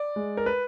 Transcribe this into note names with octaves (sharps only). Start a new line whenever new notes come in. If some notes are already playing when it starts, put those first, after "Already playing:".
Already playing: D5
G#3
A#4
B4